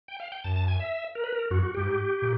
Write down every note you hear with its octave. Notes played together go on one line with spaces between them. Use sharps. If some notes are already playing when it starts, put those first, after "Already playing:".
G5
F5
G5
F#2 A5
A5
G#5
E5
A#4
B4
A#4
F#2 F#4
F#4
G2 G4
G#2
A#2